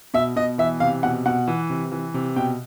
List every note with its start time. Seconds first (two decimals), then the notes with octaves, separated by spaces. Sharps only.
0.14 B2 E5
0.36 B2 D#5
0.58 E3 E5
0.80 C3 F5
1.03 B2 F#5
1.26 B2 F#5
1.48 E3
1.70 C3
1.92 E3
2.14 C3
2.36 B2 G5